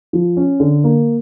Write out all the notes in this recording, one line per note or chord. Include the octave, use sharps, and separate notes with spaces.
F3
C#4
D3
A#3